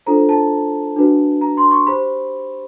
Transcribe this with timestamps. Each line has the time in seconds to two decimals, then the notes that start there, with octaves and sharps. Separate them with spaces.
0.06 D4 F4 A4 C5 A#5
0.29 A5
0.96 D4 F#4 B4
1.41 A#5
1.57 C6
1.71 C#6
1.87 G4 C5 B5